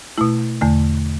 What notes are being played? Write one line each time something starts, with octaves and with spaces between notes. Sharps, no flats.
B2 A3 E4
E2 D3 A3